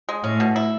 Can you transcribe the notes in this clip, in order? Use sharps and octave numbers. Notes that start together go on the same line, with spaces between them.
G#3
A2 C#4
B2
E4